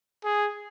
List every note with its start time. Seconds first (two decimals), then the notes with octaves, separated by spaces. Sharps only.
0.25 G#4